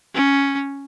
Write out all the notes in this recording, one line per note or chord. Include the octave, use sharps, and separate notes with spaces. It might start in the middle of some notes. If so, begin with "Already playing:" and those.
C#4